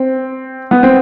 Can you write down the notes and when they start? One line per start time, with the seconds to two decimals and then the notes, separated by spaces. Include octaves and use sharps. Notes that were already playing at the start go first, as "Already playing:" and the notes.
Already playing: C4
0.71 B3
0.83 C4